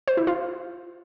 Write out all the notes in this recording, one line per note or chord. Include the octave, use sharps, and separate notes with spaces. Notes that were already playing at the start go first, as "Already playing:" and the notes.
C5
E4
F4